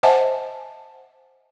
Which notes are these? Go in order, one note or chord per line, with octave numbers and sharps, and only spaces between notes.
C5 D#5 E5 F#5 G#5 A5